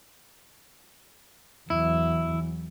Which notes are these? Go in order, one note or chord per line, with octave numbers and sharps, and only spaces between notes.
E2 E3 F#3 E4